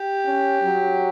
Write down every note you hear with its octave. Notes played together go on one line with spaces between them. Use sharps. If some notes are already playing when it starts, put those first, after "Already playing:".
Already playing: G4
C#4
F#3